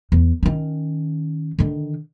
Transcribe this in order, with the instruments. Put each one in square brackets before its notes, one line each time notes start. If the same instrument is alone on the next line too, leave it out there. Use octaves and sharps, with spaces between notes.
[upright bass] E2
D#3 C#4
D3 D#3